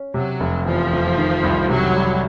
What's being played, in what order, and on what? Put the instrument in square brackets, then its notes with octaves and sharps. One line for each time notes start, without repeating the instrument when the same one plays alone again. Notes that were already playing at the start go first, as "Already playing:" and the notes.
Already playing: [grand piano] C#4
[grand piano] C3 [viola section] F#3
[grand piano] F1
[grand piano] E2 [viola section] F3
[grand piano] F1
D#3
C2
[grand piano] C3 [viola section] F#3
[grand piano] G3